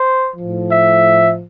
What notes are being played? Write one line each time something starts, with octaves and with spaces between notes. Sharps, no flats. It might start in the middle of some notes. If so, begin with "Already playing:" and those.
Already playing: C5
A2 F3
E5